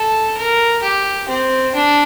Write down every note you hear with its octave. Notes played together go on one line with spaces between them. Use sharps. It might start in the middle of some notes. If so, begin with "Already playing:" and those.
Already playing: A4
A#4
G4
C4
D4